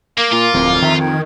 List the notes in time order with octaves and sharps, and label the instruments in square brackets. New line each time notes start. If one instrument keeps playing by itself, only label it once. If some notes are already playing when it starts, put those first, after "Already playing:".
[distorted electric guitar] A#3 [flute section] A#4 F5 D6
[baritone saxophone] A#2 [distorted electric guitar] F4
[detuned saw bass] D1 [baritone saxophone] F2
[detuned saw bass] D#3 [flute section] E5 A#5
[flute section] G5 G#6